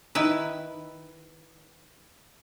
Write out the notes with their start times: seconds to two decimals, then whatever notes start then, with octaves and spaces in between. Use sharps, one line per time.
0.15 D#3 E4 B4